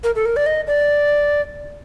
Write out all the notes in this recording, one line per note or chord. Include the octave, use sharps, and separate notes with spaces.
A#4
A4
A#4
D5
D#5
D5